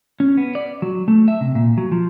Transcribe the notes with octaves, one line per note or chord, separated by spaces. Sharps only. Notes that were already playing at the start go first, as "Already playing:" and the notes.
C#4
B3
D5
F#3
A3
E5
C3
A#2
F#3
F3